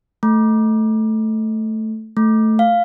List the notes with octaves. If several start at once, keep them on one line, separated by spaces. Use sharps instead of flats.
A3
A3
F5